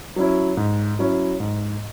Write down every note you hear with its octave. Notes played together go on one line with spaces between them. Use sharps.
F#3 C#4 E4
G#2
F#3 C#4 E4
G#2